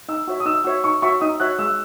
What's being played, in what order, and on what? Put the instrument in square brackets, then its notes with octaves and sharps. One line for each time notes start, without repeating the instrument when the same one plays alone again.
[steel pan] D#4 [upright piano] E6
[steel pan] F#4 C#5 E5
[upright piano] D#6
[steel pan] D#4 [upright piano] E6
[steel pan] F#4 C#5 E5
[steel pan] D#4 [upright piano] C#6
[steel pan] F#4 C#5 E5 [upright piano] C#6
[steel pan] D#4 [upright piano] D#6
[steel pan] F#4 C#5 E5 [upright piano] F#6
[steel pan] G#3 [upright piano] E6